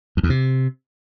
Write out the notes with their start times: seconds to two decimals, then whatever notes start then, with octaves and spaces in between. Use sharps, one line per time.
0.17 F2
0.23 E2
0.30 C3